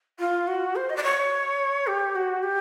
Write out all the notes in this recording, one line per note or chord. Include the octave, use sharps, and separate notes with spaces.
F4
F#4
C5
D#5
D5
C#5
G4
F#4
G4